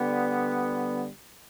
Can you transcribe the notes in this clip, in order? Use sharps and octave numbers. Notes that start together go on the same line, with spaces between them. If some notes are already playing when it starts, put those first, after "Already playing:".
Already playing: D3 G3 B3